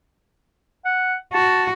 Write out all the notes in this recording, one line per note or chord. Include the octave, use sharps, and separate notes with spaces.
F#5
F#4 A5